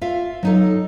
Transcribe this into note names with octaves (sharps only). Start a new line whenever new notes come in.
F4 E5 F5
F#3 D#4 A4